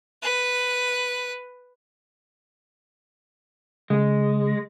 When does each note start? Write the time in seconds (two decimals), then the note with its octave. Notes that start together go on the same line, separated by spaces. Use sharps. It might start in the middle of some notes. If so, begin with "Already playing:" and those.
0.22 B4 F#6
3.90 C#3 G#3